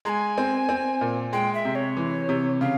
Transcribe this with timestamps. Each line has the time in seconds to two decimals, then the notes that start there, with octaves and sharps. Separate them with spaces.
0.05 G#3 A#5
0.09 G#5
0.38 C4
0.69 C4
1.01 A#2
1.33 G#3 G5
1.54 E5
1.65 C3
1.75 C#5
1.97 E3
2.29 C3
2.61 C#3 F5